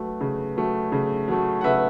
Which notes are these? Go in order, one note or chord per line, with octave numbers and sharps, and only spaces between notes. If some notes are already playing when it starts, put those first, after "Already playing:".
Already playing: F#3 A3 B4
C#3
F#3 A3
C#3
F#3 A3
F#5
C#3 B4 E5